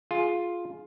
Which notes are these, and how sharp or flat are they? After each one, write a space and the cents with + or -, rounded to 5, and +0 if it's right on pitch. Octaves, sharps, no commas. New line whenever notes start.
F4 +5 G#4 +15